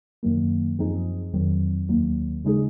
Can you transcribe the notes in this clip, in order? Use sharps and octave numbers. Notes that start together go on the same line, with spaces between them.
F#2 D#3 F#3 A#3
F#2 F3 C4 D#4 G#4
F2 D#3 F#3 C4
D#2 D#3 F#3 A#3
C#3 G#3 D#4 G#4